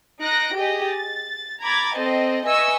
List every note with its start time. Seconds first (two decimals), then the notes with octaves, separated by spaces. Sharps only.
0.21 D#4 F#6 A#6 D7
0.56 G4 G#4 D#5
0.87 A6
1.61 A#5 B5 D6 G#6 A6
1.96 C4 A4 C5 D#5
2.47 B4 D#5 E5 G#5 C#6 E6